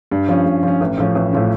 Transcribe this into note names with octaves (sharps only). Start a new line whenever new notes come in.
G2
F3 C#4
G2
F3 C#4
A1
A2 F3 C#4
A1
A2 F3 C#4